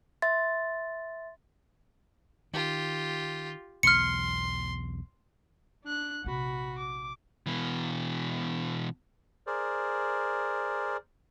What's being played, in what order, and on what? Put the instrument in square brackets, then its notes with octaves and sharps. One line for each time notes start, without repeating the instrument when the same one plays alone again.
[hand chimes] E5 C6 A6
[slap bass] D#3 [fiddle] F4 G4
[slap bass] B1 E2 [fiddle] C6 [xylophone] F6 C#7
[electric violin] D4 F#6
[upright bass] A#1 C3 [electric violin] F#4 B5
[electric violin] D6
[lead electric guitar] B2 E3
[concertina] G#4 A#4 C5 D5